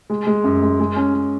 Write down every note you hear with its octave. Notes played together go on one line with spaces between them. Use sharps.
G#3
G#3
F#2
G#3
G#3
C#4
C#4